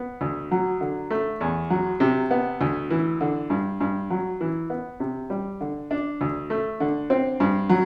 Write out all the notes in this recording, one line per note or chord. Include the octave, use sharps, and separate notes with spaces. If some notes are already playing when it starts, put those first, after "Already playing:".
Already playing: B3
D2
F#3
D3
A3
E2
F#3
C3
B3
D2
E3
D3
G2
G2
F#3
E3
B3
C3
G3
D3
D4
D2
A3
D3
C4
G2
F#3